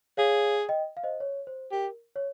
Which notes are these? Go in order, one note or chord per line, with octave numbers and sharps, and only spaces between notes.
G#4 C#5 F5
D#5 G5
F5
C5 D#5
C#5
C5
G4 A#4
C#5